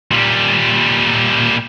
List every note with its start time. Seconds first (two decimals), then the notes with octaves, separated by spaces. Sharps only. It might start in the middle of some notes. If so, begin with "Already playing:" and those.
0.12 A#2 G3